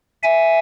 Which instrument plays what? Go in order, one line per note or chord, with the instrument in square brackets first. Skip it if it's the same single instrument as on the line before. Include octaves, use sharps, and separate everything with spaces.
[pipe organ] E5 G#5